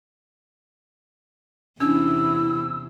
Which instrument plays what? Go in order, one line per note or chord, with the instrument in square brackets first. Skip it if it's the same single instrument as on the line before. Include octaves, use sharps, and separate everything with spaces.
[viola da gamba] E2 C3 E3 [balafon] C#4 D4 [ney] E4 [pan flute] E6